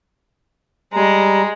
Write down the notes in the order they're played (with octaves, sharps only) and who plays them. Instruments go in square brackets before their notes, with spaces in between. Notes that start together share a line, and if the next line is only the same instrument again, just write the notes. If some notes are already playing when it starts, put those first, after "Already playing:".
[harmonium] G3 A#5 [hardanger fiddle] G#3